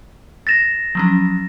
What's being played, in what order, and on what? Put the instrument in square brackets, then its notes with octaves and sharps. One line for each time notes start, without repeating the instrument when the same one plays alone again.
[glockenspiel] A6 A#6 E7
[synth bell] F3 F#3 C#4